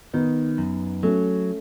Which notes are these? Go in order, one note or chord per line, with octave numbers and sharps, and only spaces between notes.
D#3 B3 D#4
F#2
F#3 A3 C#4